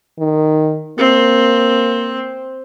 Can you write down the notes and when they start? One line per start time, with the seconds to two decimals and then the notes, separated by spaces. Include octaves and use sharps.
0.19 D#3
0.98 A#3 C4